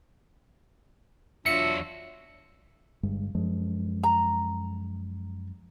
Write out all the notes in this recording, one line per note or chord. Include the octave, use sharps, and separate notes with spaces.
E2 F#3 D4 F4 F#4 E5 C#7
G1 G2 G#3
F#2 F3 G#3
A#5